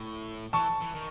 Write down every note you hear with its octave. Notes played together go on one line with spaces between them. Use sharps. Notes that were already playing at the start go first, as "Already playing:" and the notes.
Already playing: A2 C#6
E3 A5 C#6
E3
D#3